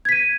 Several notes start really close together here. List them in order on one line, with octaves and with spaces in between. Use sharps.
G#6 B6 D#7